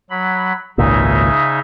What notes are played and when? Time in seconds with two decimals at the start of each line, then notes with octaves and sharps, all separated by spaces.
0.10 F#3 B5
0.78 G#1 C#2 A#2 C#3 D#4 E5